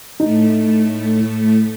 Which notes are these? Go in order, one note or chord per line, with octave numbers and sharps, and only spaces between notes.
A2 A3 D#4